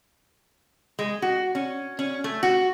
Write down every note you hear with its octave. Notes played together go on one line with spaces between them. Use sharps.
G#3
F#4
C#4
C#4
A3
F#4